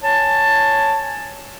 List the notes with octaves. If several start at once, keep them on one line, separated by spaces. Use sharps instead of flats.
C#5 G#5 A5